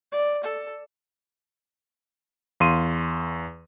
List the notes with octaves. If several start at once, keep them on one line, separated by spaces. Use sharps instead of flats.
D5
A4
E2 F5 C6 D#7